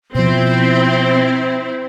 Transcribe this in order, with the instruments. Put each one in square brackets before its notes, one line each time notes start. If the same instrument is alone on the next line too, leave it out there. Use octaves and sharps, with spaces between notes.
[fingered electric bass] B2 F3 [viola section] C4 E4 [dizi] C5